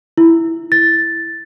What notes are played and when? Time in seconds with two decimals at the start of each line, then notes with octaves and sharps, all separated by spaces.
0.18 E4
0.72 A6